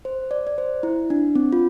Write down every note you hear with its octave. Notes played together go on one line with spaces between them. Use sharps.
C5
D5
D5
C5
E4
D4
C4
F4